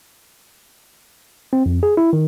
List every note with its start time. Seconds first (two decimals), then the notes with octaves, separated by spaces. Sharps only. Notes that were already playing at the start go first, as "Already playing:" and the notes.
1.53 C4
1.66 F2
1.83 G#4
1.97 E4
2.13 D#3